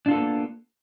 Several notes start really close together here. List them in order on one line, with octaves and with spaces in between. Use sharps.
D4 F4 A4 B3 A#3